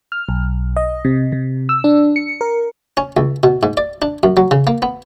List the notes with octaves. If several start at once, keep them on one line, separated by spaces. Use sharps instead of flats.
F6
B1
D#5
C3
C3
E6
D4
C#7
A#4
C#4
C#2
B2
G#2
D5
D4
F#2
F#3
C#3
A#3
B3